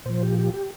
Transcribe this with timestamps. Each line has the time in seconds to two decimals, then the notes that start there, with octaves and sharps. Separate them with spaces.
0.06 A#2 F3 C5
0.22 G4
0.39 G4
0.54 G4